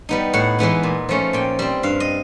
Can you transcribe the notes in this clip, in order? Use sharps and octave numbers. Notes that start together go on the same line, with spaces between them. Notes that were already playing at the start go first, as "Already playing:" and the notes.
G3 B3 D#4
A2 F#5
E3 G#3 B3 D#4
A#2
F3 A3 C#4
A#2 G5
G3 C4
G2 F5
D#5